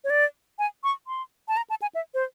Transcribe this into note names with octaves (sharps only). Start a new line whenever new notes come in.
C#5
D5
G#5
C#6
C6
A5
A#5
A5
G#5
E5
C5